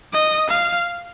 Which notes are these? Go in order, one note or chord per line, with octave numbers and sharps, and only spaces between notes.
D#5
F5